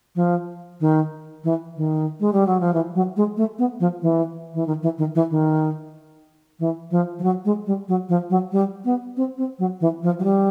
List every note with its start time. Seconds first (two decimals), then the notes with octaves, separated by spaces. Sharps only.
0.16 F3
0.81 D#3
1.44 E3
1.77 D#3
2.20 G#3
2.33 G3
2.47 F#3
2.60 F3
2.74 E3
2.95 F#3
3.17 G#3
3.37 A3
3.59 B3
3.80 F3
4.02 E3
4.54 E3
4.67 D#3
4.83 E3
4.98 D#3
5.15 E3
5.30 D#3
6.60 E3
6.91 F3
7.19 F3
7.23 F#3
7.45 G#3
7.66 G3
7.88 F#3
8.09 F3
8.30 F#3
8.52 G3
8.85 B3
9.17 C4
9.38 C4
9.59 F#3
9.81 E3
10.03 F3
10.19 F#3
10.24 G3